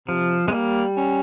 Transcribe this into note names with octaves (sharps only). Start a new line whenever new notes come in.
C3 F3
G#3 C4
G3 A#3
C#4